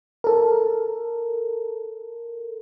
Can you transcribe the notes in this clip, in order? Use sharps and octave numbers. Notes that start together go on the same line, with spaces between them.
A4 A#4